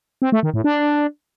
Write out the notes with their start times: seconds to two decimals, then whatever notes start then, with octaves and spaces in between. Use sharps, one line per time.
0.22 C4
0.32 A3
0.43 D#3
0.54 A2
0.64 D4